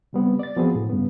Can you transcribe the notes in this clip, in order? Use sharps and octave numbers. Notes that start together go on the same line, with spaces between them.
C#3 G3 B3 C4
D5 A6
F3 B3 C4 F#4 G#4 B4
A2
G2 C#3 B3